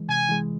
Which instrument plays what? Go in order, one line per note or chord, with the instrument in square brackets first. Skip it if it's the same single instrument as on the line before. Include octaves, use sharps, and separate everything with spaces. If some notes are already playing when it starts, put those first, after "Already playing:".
Already playing: [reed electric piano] E3 G#3
[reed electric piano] C3 [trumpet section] G#5
[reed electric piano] E3 G#3